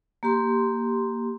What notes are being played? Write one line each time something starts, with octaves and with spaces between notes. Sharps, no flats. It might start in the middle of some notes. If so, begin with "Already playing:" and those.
A#3 G4 C6